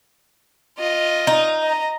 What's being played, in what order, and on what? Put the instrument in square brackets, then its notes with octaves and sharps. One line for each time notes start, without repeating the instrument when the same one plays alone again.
[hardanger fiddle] F4 D#5
[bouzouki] D#4
[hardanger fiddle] D#5 A#5